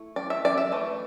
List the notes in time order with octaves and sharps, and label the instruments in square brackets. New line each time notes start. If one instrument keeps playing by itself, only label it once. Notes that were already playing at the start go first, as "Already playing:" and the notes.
Already playing: [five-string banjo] A3 E4
D5
E5
D5
E5
E3 A3